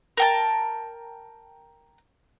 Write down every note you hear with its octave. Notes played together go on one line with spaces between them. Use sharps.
A#4 G5 A5